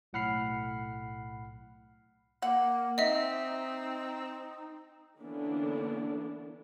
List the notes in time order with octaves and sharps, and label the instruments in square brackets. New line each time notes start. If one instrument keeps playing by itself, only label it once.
[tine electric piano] B1 A2 F#5 B5 F6 C7
[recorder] A#3 [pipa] F#5
[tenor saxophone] C4 [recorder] D#4 [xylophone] D#5 E5
[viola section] D3 E3 A#3 B3 C#4 D4